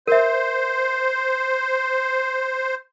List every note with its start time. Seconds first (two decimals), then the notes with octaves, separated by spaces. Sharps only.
0.07 A#4 C5 E5